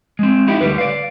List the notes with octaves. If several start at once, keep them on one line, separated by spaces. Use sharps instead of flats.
G#3 C4
D#4 E4 G4
D2 G3 B4
D5 F5